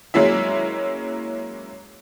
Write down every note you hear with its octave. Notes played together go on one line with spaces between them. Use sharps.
F#3 G#3 A#3 C#4 E4 E5